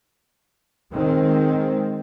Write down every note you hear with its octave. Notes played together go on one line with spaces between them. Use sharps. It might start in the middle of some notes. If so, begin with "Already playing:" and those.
D#3 G#3 C4